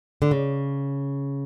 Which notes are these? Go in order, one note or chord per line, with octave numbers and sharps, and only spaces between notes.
D3
C#3